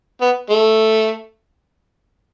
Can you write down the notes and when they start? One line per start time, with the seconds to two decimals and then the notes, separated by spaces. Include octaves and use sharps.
0.21 B3
0.50 A3